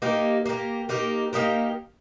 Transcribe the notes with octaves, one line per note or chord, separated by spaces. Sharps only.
A#3 D#4 G4 A#4
A#3 D#4 G4 A#4
A#3 D#4 G4 A#4
A#3 D#4 G4 A#4